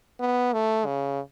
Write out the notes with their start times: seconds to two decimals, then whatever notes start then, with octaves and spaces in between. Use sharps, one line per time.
0.20 B3
0.53 A3
0.86 C#3